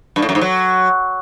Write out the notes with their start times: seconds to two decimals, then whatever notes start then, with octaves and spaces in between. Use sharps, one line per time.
0.16 G2
0.22 A2
0.29 F#2
0.35 G#2
0.41 F#3